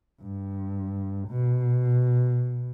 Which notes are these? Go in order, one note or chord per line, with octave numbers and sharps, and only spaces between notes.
G2
B2